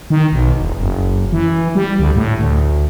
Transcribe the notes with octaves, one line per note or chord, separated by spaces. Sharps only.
D#3
B1
E1
F#1
E3
G3
D2
A2
D2